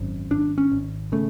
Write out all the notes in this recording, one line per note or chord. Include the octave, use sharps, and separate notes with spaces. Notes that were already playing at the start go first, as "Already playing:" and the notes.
Already playing: G#1 F#2
G#1 D4
C#4
G#1
C#3 A3